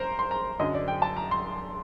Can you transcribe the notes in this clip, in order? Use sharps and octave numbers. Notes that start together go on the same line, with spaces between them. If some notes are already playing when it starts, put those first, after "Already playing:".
Already playing: A#4 C5 A#5
C6
A#5
F#2 D3 F#3 D#5
D5
G5
A5
A#5
C6